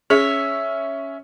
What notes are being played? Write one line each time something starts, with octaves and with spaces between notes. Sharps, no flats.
C#4 G#4 C#5 E5